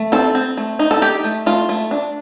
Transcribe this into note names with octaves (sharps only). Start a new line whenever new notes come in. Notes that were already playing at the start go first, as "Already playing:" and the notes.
Already playing: A3
C4 A4
C4
A3
D#4
A4
D#4 G4
A3
A3 F4
A3
D4